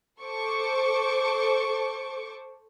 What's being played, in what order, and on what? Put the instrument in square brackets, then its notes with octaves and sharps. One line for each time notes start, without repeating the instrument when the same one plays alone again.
[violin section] A4 C5 C#6 D6